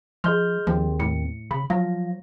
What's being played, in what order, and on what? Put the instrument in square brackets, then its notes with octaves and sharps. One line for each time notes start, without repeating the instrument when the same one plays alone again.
[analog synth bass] F3 [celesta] G#4 D#5 C6 [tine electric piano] F6 G6
[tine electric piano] D#2 C4 [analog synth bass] F3
[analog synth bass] A2 [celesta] C#7
[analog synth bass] C#3 [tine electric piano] B5
[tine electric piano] F3 [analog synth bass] F#3 [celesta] F5 A#6